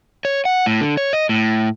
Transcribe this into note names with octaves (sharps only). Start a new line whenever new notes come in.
C#5
F#5
A2
D3
C#5
D#5
A2